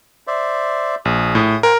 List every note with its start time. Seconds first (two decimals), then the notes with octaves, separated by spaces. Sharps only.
0.27 C5 D5 E5
1.05 A#1 G#4 D#6
1.35 A2
1.63 A#4 C5 F#5 G#5